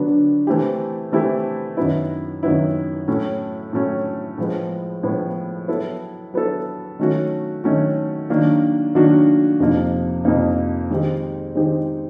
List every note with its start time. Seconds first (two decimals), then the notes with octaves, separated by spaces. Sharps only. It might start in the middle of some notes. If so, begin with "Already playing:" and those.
Already playing: D3 F#3 B3 D4
0.47 E3 A3 C4 E4 G4
1.12 E3 A3 C4 E4 G4
1.77 F#2 D#3 F#3 B3 E4
2.43 F#2 D#3 F#3 B3 E4
3.08 A2 F#3 A3 C#4
3.73 A2 F#3 A3 C#4
4.38 A2 F3 G#3 B3
5.03 A2 F3 G#3 B3
5.68 F#3 B3 E4 A4
6.34 F#3 B3 E4 A4
6.99 D#3 F#3 A3 C#4 F#4
7.64 D#3 F#3 A3 C#4 F#4
8.30 D#3 F#3 A#3 D4 F#4
8.95 D#3 F#3 A#3 D4 F#4
9.60 F2 C3 F3 A#3 D#4
10.25 F2 C3 F3 A#3 D#4
10.90 D#3 G#3 C4 D#4 G4
11.55 D#3 G#3 C4 D#4 G4